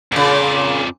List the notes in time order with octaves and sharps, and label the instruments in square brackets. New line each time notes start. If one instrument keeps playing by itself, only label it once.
[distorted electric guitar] F2 D5 [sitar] A#2 C#3